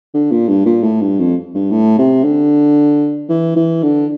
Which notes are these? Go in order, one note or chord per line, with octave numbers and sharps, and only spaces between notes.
D3
A#2
G2
A#2
A2
G2
F2
G2
A2
C3
D3
E3
E3
D3